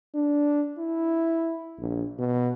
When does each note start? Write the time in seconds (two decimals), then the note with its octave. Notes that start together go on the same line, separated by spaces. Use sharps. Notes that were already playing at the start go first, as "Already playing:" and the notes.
0.15 D4
0.78 E4
1.79 A#1
2.19 B2